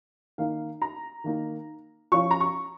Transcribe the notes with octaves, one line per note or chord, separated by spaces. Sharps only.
D#3 A#3 D#4 F5
A#5
D#3 A#3 D#4
F3 C#4 F4 C#6
A#5
C#6